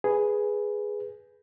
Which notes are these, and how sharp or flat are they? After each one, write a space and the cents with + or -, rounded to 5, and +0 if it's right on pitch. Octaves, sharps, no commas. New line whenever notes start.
G#4 +0 B4 +0